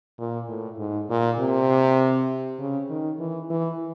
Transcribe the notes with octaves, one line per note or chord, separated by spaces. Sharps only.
A#2
A2
G#2
A#2
C3
C#3
D#3
E3
E3